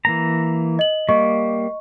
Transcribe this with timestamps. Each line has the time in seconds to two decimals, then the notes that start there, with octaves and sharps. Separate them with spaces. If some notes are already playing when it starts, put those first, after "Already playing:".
0.05 E3 A#3 A#5
0.79 D#5 F#7
1.09 G3 A#3 D#5 C#6